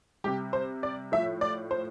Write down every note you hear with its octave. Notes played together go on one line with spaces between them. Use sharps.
C3 G3 G4
C5
D5
A2 F3 E5
D5
C5